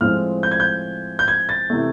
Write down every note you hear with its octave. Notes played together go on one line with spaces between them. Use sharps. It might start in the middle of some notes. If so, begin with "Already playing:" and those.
A2 F3 G#3 C4 F6
G6
G#6
G6
G6
G#6
A6
C3 E3 A3